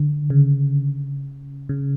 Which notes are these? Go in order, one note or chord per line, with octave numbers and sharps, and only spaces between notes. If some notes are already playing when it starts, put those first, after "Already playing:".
Already playing: D3
C#3
C#3